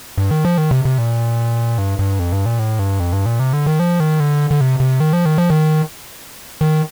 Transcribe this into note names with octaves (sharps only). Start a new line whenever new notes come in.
G2
D#3
F3
D#3
C3
C3
A#2
G2
G2
F2
G2
A#2
A2
G2
F2
G2
A#2
C3
D3
D#3
F3
D#3
D3
D3
C3
C3
D#3
F3
D#3
F3
D#3
D#3